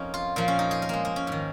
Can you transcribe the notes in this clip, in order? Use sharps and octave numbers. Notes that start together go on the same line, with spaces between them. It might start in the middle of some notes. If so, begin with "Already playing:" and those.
Already playing: F2 A#3 C#4 D#4
F4
A#2 F3 A#3
C#4
D#4
G#4
A#4
G#3 A#3
A#3
C#4
G#2 D#3